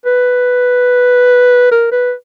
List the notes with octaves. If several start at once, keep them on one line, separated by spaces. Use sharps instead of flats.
B4
A#4
B4